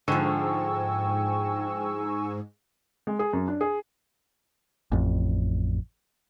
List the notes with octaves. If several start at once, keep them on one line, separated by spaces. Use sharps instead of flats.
G#2 D3 F3 G5 G#5 C#6 E6
G#3
G#4
F#2
D4
G#4
A1 F2